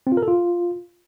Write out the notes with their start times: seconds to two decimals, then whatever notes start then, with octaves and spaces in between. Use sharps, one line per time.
0.07 C4
0.12 F4
0.17 A#4
0.23 A4
0.28 F4